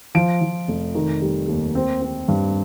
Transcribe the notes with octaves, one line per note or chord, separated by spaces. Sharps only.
F3 D7
F3
F1
D#3
G3
D#2
C4
C4
G2